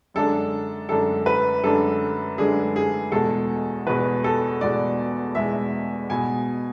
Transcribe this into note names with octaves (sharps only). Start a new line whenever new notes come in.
F#2 D3 G#3 D4 A4
F#2 D3 G#3 D4 A4
B4
F#2 D3 G#3 D4 A4
F#2 D3 G#3 D4 G#4
G#4
E2 B2 G#3 A4
E2 B2 G#3 B4
A4
E2 B2 G#3 D5
E2 B2 G#3 E5
B2 G#3 B3 G#5